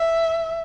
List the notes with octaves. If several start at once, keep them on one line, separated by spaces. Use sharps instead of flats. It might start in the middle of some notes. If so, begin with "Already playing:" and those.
Already playing: E5